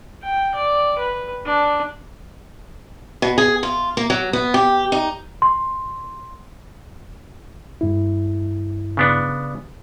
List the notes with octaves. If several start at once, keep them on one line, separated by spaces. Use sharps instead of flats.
G5
D5
B4
D4
B2
G#4
F4
A#3
F#3
B3
G4
D#4
C6
G2 E4
C#3 B3 D4